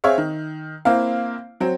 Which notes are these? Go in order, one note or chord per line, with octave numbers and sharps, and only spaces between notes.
C4 G#4 C#5 E5 F5
D#3
A#3 C4 E4 F5
F#3 C4